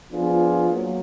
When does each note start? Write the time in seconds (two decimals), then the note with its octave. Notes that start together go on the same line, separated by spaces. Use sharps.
0.12 F3 B3 D4 F4 G#4
0.71 F#3 A#3